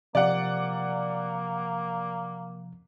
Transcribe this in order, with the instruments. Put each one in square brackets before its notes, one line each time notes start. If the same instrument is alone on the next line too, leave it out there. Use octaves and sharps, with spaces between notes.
[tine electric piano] C3 F3 [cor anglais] A#3 [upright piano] D5 F#5